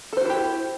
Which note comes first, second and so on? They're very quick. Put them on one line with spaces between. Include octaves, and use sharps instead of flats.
A4 C5 F#4 E4 G4